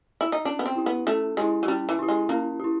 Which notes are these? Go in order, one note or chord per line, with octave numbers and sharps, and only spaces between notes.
E4
D#4
C#4 D4
B3
C4
E4 G4
B3
A3 C#4
G#3 E4 G4
F#3
G3 C#4
E3
E4 G4
G#3
A#3 C#4
E4 G4